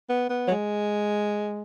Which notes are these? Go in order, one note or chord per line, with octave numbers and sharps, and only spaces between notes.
B3
B3
F#3
G#3